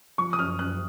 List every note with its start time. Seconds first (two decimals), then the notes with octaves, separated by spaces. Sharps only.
0.18 F3 C#6
0.33 D#6
0.39 F#2 F6
0.59 F#2 F#6